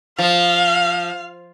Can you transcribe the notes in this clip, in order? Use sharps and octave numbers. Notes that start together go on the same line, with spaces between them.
F3 F5